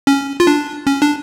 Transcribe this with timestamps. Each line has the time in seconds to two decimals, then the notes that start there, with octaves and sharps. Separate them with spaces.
0.07 C#4
0.40 F4
0.47 D4
0.87 C#4
1.02 D4